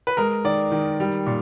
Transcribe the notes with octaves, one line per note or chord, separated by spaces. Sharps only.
B4
G#3 A#4
D#3 D5
D#3
G3
A#2